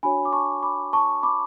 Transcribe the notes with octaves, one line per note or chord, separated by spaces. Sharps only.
D4 F#4 C#5 G#5 B5
D6
A5 C#6
B5 D6
A5 C#6
B5 D6